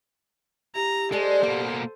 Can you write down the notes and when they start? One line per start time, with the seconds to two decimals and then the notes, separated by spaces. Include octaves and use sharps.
0.75 E4 G4 A#5
1.12 G#3 A4 C5 D5 A5
1.43 B2 A#3 F#4